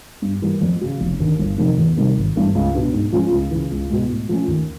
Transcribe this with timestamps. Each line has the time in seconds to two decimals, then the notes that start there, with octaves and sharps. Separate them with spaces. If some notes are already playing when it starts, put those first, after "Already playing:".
0.22 G2
0.42 E3 G3 A#3
0.61 F2
0.81 C#3 F#3
1.01 F1
1.20 D#2 D3
1.39 G1
1.58 F2 C3 D#3
1.78 E2
1.97 C3 D#3 G3
2.17 G#1
2.36 G2 E3 A3
2.55 C#2
2.74 B2 F#3 B3 D4
2.93 G#2
3.12 F3 G#3 C#4 F4
3.32 C#2
3.51 C#3 E3
3.71 C#2
3.90 B2 G#3
4.09 A2
4.29 F3 A3 C#4
4.48 D#2